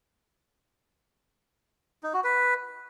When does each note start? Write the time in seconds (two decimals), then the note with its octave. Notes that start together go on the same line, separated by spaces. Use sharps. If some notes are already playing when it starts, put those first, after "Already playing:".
2.03 D#4
2.14 F#4
2.24 B4